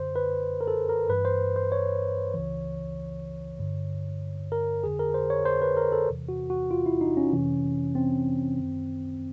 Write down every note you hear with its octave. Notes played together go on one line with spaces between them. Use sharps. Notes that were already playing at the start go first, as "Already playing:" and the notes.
Already playing: F#2 D3 C5
B4
A#4
A4
A#4
G2 E3 B4
C5
C5
C#5
C#2 C#3 E3
G2 D3
A#4
F2 D3 G#4
A#4
C5
C#5
C5
B4
A#4
A4
E2 C3 E3
F#4
F#4
F4
E4
D#4
C#4
F2 C3 E3
C4
F#2 D#3